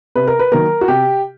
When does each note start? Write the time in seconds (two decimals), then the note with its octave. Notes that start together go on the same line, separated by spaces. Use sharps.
0.16 C3 B4
0.27 A#4
0.39 B4
0.52 D#3 F#3 A#3 A#4
0.81 F#4
0.88 C3 G4